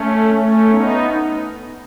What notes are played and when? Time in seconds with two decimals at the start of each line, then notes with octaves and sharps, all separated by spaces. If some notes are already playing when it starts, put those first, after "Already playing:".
Already playing: A3 C#4
0.34 A3 C#4
0.68 B3 D#4